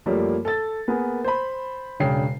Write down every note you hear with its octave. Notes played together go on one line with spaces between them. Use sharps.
F#2 F3 G3 A3 A#3
A4 A6
A#3 B3 G#4 A#4
C5 B5
E1 C#3 D4 G5 C7